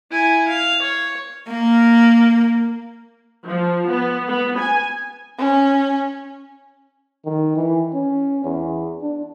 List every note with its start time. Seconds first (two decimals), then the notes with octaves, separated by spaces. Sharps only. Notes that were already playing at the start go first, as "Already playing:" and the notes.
0.10 E4 G#5
0.48 F5
0.82 C#5
1.48 A#3
3.48 F3
3.90 B3
4.29 B3
4.59 G#5
5.38 C#4
7.25 D#3
7.56 E3
7.94 C#4
8.44 E2
9.02 D4